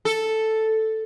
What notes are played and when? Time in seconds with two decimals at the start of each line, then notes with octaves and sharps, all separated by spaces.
0.05 A4